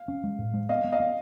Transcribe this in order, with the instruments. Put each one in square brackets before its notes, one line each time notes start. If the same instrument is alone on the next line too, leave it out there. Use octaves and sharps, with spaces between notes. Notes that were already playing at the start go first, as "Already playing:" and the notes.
Already playing: [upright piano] F5
[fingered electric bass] C#4
G#3
A2
G#3
[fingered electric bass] B3 [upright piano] D#5 F5
[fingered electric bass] B3
[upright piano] D#5 F5
[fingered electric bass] B3